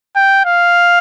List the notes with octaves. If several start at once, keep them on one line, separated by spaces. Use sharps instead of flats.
G5
F5